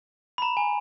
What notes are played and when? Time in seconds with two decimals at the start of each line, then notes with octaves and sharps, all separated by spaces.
0.38 B5
0.42 A#5
0.57 G#5